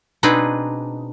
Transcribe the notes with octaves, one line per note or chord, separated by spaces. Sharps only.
B2 C4 D4 D#4 G#4 B4